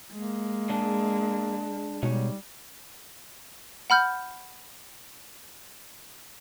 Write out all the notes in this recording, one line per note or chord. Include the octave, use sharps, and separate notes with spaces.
G#3 A#3
D4 G#4 D#5
B2 G3 G#3 D#4 C#5
F#5 B5 F6 G6